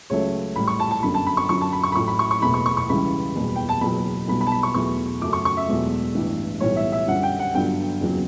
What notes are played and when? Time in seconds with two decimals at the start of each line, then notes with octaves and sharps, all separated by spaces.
0.10 C#2 C#3 F#3 A3 C#5
0.56 A1 A2 G3 B5
0.68 C#6
0.80 A5
0.91 A5
1.03 G1 F#2 D3 F#3 B5
1.14 A5
1.27 B5
1.37 C#6
1.49 F#2 D3 F#3 C#6
1.61 A5
1.73 B5
1.83 C#6
1.92 B5
1.95 A1 A2 F#3 A3 C#6
2.07 B5
2.19 C#6
2.31 C#6
2.42 F#1 E2 B2 A3 B5
2.54 C#6
2.66 C#6
2.77 C#6
2.89 C#2 C#3 E3 G3 B5
3.36 F#1 E2 B2 G3
3.56 G5
3.69 A5
3.81 F#1 E2 B2 F#3 B5
4.28 B1 B2 G3 B5
4.41 B5
4.47 A5
4.52 B5
4.63 C#6
4.74 E2 B2 F#3 A3 C#6
5.21 F#2 C#3 F#3 A3 D6
5.33 C#6
5.45 C#6
5.57 E5
5.68 E1 E2 B2 F#3 A3
6.15 A1 G2 E3
6.60 B1 A2 E3 G3 C#5
6.76 E5
6.92 E5
7.07 F#2 D3 G3 F#5
7.23 G5
7.39 F#5
7.54 G1 G2 D3 F#3 G5
8.01 F#1 E2 C#3 F#3